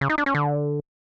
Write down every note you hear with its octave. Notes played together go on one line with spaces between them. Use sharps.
C#3
D#4
D4
C#4
D3